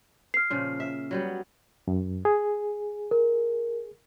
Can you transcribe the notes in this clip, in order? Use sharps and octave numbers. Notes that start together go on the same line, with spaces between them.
F6 C7
A#2 C#3 F3
E5
F#3 G3 B3
F#2
G#4
A#4